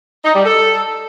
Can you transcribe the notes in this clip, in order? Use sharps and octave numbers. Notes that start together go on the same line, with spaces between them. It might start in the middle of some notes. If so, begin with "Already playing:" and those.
D#4
G3
A4